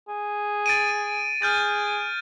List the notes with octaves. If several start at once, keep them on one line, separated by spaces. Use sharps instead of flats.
G#4
A6 D7 D#7
G#4 F6 G6 A6